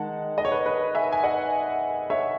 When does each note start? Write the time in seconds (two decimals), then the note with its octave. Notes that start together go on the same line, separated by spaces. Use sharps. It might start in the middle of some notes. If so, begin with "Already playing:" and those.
Already playing: D#3 G#3 D#4 F#5 A5
0.38 D#5
0.45 C#5
0.52 B4
0.59 C#5
0.66 B4
0.95 E5 G#5
1.12 G#5
1.24 D#5 F#5
2.10 C#5 E5